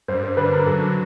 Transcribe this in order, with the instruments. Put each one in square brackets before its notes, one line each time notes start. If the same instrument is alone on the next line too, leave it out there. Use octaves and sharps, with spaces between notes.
[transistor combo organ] G2 [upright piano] C5
[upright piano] C5
[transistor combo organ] D3 [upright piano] B4
[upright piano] A#4
[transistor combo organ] F#3 [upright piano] A4